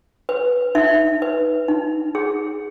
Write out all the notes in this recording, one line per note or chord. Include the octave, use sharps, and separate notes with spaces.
B4
D#4 E5
B4
D#4
G#4